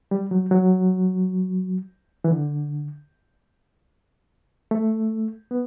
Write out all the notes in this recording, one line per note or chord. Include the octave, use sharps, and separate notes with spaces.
G3
F#3
F#3
E3
D3
A3
B3